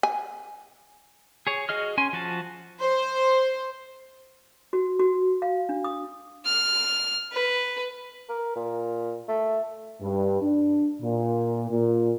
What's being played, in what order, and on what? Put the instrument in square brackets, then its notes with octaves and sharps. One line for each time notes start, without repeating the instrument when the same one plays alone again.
[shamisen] G#5
[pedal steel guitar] G#4 C#5
F#4 G#4 D#5 F6
C#4 G#5 C6
F3 F#4 A5
[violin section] C5
[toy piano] F#4
F#4
F5
D4
D#6
[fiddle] F6
B4
[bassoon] A#4
A#2
A3
[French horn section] G2
D4
A#2
A#2